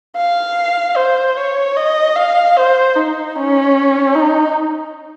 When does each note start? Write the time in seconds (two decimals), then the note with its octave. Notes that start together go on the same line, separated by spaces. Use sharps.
0.17 F5
0.96 C5
1.37 C#5
1.76 D#5
2.16 F5
2.57 C5
2.96 D#4
3.36 C#4
4.16 D#4